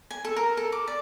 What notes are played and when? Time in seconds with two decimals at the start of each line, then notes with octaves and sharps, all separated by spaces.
0.11 G#5
0.25 A4
0.36 A#4
0.57 A4
0.72 D6
0.88 D5